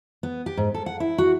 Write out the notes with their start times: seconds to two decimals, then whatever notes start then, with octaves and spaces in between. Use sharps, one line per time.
0.23 B3
0.46 G4
0.57 G#2
0.74 A4
0.86 F#5
1.00 E4
1.18 F#4